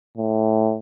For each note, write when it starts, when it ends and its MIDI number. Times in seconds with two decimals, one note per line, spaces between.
0.17 0.77 45